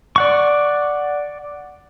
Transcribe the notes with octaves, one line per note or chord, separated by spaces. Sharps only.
D5 F#5 C#6